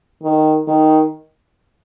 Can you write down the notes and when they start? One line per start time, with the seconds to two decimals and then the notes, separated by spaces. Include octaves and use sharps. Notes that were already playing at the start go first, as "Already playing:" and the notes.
0.23 D#3
0.68 D#3